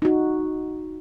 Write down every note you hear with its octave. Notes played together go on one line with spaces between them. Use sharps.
D#4 F#4